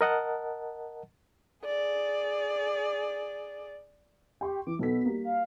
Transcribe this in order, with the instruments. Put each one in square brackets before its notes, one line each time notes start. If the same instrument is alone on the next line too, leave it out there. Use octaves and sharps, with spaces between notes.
[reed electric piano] A#4 D#5 F#5 A5
[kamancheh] G#4 D5
[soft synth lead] G4 [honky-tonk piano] G5 C6 C#6
[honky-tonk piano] E3 [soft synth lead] D6
[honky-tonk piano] B1 A4 B6 [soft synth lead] B3
[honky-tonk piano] G3 A#3
[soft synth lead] F5